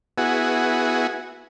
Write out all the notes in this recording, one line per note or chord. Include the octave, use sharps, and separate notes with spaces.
B3 E4 F#4 G#4